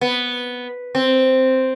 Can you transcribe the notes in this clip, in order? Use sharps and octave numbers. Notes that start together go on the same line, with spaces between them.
B3
C4